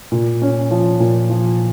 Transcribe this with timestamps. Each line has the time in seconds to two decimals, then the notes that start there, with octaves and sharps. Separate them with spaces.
0.12 A#2
0.42 C#4
0.71 F3
1.00 A#2
1.30 F3